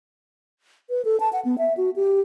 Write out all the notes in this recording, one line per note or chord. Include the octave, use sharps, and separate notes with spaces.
B4
A4
A5
F#5
B3
E5
F#4
G4